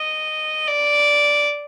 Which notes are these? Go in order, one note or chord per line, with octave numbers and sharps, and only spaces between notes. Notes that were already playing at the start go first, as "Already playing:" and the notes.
Already playing: D#5
D5